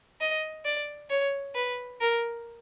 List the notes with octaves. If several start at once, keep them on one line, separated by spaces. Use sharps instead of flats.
D#5
D5
C#5
B4
A#4